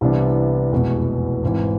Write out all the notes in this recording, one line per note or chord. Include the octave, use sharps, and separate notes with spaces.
C2 C3 E3 B3 D4
F1 E2 B2 G#3
G#1 G#2 E3